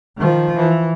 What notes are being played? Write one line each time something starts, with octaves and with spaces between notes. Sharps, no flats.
D#3 F3
E3